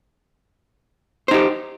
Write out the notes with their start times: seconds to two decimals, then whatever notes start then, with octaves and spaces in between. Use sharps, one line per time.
1.28 C5
1.31 D#4
1.34 G4